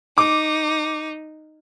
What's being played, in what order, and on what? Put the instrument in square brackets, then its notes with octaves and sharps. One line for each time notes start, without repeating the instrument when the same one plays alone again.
[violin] D#4 [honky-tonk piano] D6